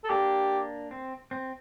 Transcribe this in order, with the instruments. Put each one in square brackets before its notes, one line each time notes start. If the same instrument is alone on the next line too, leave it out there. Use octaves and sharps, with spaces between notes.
[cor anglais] A4
[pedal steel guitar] A#3 D4 [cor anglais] G4
[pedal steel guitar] C4
C4